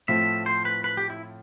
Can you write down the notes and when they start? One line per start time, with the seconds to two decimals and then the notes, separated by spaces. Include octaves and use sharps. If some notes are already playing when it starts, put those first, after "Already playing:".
0.08 A2 F3 A3 C4 F4 E5
0.46 C5
0.65 B4
0.84 B4
0.97 G4
1.10 E4